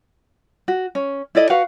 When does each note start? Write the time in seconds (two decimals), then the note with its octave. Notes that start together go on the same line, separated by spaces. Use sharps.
0.68 F#4
0.95 C#4
1.35 E4 A4 D5 D#5
1.50 F#4 B4 F5 F#5